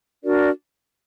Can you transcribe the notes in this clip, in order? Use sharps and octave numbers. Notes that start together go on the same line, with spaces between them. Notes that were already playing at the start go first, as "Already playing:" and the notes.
D4 F#4 A#4 D5